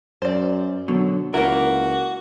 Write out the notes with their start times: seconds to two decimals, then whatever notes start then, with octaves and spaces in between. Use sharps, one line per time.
0.22 F#2 C5 D5
0.88 B2 D3 F#3
1.34 C#2 A#3 E4 F#4 A#4